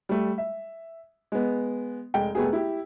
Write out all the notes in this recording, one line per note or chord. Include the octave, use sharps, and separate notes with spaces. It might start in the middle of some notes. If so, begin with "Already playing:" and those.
G3 A3
E5
G#3 B3
F1 G#3 G5
F1 A3 B3 G4 G#4
E4 G4